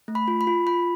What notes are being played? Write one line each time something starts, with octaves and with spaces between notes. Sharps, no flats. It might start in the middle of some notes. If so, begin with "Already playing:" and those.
A3
B5
F4
B5
F4
F4 B5